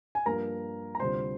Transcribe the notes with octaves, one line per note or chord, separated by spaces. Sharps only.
G#5
G2 F3 A#3 A#4 A#5
A#5
D2 C3 G3 D4 F4 C5 C6